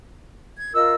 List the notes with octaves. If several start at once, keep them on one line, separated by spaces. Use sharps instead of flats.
G#6
F4 A#4 D#5 E6